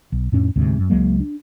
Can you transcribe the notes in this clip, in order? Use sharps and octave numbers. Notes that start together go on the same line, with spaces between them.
B1
F2 A2 C#4 D4
D#1 D2 G#2 C3
F#2
C#2 F#3 G#3 A#3
D4